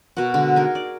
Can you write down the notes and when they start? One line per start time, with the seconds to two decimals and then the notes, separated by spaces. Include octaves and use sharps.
0.17 B2 F#4 A#4 F#5
0.34 D3 G#3
0.56 D#4 G#4 A#4
0.75 D5